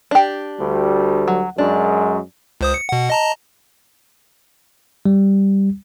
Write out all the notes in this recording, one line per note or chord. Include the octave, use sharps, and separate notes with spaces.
D4 G4
D2 G3
F#3
F#2 G#3 D4
C#2 C5 D#6
C#7
B2 F#5
D#5 A5 A#5
G3